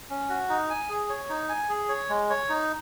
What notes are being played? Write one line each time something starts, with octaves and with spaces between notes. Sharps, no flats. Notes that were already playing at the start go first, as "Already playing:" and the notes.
C#4
F#4
D#4
G#5
G#4
C#5
D#4
G#5
G#4
C#5
G#3
C#5
D#4